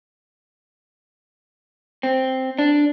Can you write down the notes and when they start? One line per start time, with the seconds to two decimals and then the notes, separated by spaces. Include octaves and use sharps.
2.03 C4
2.59 D4